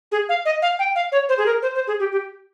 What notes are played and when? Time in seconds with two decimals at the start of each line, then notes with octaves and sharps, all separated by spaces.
0.12 G#4
0.29 F5
0.45 D#5
0.62 F5
0.79 G5
0.96 F5
1.12 C#5
1.29 C5
1.38 G#4
1.46 A#4
1.62 C5
1.75 C5
1.87 G#4
2.00 G4
2.12 G4